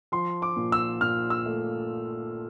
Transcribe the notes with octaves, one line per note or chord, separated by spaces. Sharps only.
F3 C6
D6
A#2
E6
A#2 F6
E6
A3